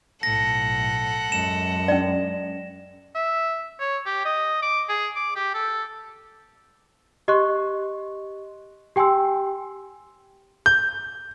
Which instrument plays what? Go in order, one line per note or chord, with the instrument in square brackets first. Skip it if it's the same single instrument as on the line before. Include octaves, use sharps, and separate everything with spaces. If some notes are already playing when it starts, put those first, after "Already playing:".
[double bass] B1 A2 [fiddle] A4 F#5 [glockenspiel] A#6
[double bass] F#2 G#3 [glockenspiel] E7
[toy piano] C#4 D5
[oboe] E5
C#5
G4
D#5
D6
G#4
D6
G4
A4
[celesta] G4 D#5 C6 C#6 F#6
G4 G5 G#5 C6 E6
[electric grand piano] G6